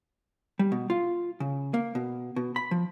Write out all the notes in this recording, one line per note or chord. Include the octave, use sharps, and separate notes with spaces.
G3
B2
F4
C#3
A#3
B2
B2
B5
F3